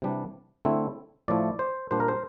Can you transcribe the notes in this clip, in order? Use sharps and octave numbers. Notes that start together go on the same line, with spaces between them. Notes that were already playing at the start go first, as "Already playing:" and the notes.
C3 E3 G3 D4
D3 A3 C4 E4
A2 F3 A3 E4 D5
C5
A#2 G3 D4 C5
A#4
C5